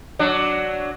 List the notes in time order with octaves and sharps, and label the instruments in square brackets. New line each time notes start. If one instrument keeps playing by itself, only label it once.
[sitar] F#3 D4